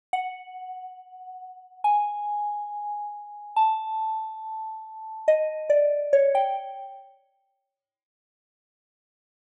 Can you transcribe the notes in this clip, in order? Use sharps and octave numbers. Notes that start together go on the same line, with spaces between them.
F#5
G#5
A5
D#5
D5
C#5
G5